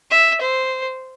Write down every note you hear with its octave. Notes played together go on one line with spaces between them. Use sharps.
E5
C5